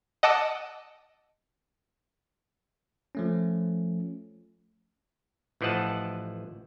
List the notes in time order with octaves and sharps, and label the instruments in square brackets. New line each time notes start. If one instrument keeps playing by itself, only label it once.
[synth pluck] D#5 F#5 A5 D6 E6
[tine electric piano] F3 A3 C#4
[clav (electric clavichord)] A1 E3 F3 D#5 F#5 A5